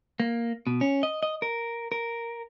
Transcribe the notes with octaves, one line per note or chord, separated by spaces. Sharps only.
A#3
B2
C#4
D#5
D#5
A#4
A#4